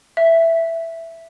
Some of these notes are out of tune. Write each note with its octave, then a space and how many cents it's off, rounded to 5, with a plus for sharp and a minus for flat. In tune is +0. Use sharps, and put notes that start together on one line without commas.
E5 +5